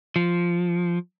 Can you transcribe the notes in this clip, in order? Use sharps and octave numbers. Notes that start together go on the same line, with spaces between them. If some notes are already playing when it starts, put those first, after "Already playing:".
F3